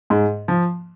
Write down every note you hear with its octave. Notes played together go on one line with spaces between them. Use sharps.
G#2
F3